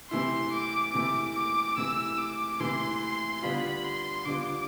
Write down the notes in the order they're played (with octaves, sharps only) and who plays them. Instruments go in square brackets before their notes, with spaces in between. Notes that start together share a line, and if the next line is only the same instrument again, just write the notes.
[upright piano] C3 E3 A3 E4 [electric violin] C6
[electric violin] D6
[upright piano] C3 E3 A3 E4 [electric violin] D6
[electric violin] D6
[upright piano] C3 E3 A3 E4 [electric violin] E6
[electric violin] D6
[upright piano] C3 E3 A3 E4 [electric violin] C6
[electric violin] C6
[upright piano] D3 G3 B3 D4 F4 [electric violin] B5
[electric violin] C6
[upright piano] D3 G3 B3 D4 F4 [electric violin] D6